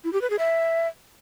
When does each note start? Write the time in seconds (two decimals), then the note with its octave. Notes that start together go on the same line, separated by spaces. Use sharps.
0.04 E4
0.13 G4
0.21 B4
0.30 G#4
0.39 E5